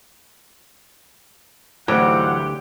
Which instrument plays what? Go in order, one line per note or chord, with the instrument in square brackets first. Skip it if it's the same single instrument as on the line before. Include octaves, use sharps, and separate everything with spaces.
[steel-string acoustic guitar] D2 [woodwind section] G#2 F5 F#5 [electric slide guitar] E3 F#3 [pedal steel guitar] G4